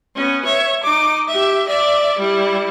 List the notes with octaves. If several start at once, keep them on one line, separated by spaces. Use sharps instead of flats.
B3 C#4
C#5 E5
D#4 D6
G4 E5
D5 E5
G3 E4